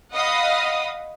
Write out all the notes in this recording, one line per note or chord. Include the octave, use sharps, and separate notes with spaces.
D#5 F5 F#5 B5 D#6